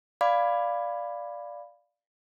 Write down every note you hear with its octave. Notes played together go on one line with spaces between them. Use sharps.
D5 F5 B5 D6 G#6